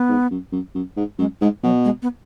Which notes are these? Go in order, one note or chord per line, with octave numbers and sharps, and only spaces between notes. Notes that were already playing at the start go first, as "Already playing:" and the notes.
Already playing: B3
G#2
F#2
F#2
F#2
G#2
F#2 G#3
G#2 G#3
B2 F#3
G#3
B3